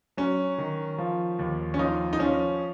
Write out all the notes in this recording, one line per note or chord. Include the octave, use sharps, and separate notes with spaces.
F#3 C#4
D#3
F3
D#2
C#4
F3 D#4
D#4
F3 C#4